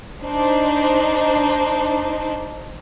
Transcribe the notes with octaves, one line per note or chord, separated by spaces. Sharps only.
D4 D#4 C5